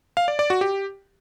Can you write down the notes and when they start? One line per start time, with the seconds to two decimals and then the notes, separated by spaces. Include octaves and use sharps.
0.17 F5
0.28 D5
0.39 D5
0.50 F#4
0.61 G4